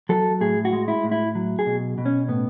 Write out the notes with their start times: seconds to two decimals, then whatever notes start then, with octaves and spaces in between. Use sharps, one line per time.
0.09 F#3 A4
0.41 A2 G#4
0.65 F#4
0.72 G#3
0.88 E4
1.04 A2
1.12 E4
1.35 F#3
1.59 G#4
1.66 B2
1.98 B2
2.06 C#4
2.29 A2 B3